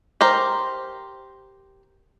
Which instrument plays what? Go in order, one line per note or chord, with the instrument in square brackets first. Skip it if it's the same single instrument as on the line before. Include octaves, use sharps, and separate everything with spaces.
[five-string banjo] G4 A#4 C5